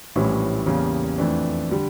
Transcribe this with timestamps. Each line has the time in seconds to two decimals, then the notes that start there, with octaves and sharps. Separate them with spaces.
0.16 A#1 A2 E3 G3 C#4
0.66 E2 C#3 G3 A#3
1.18 F2 E3 A3 D4
1.70 D3 G3